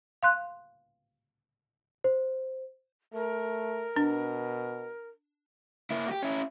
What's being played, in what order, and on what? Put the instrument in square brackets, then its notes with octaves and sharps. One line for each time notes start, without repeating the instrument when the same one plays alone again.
[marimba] F5 C6 F#6
[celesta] C5
[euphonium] A3 [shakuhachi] A#4
[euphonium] B2 [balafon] D4
[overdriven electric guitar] A#3 E4
F#4 G4
C#4 E4